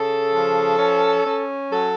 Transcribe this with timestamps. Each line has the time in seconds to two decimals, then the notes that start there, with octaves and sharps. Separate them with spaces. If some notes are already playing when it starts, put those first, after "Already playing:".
Already playing: C#3 A4
0.31 F3
0.78 C#4
1.25 C#4
1.71 F#3 A4